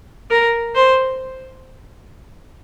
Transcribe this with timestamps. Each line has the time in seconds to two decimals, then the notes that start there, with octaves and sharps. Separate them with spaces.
0.30 A#4
0.75 C5